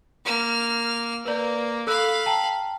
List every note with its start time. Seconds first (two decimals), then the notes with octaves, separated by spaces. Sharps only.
0.25 A#3 F6
1.25 A#3 B4 D5
1.87 A4 F5 B5 E6 F#6
2.26 G5 A5 A#5